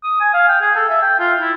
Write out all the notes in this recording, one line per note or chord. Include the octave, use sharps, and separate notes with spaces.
D#6
G#5
F5
G5
G#4
A4
E5
G5
F4
E4